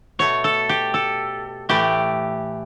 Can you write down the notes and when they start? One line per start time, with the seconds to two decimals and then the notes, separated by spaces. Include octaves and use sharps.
0.19 B2 A3 C#5
0.44 A4
0.69 G4
0.94 A4
1.69 A2 E3 A3 G4